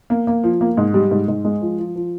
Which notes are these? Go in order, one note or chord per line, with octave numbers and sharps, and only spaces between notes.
A#3
A#3
F3
A#3
G#2
G3
G#2
G#2
G#3
F3
F3
F3